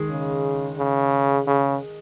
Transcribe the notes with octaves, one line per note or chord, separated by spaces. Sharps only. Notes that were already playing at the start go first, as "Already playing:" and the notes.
Already playing: D#3 G#3 G#4
C#3
C#3
C#3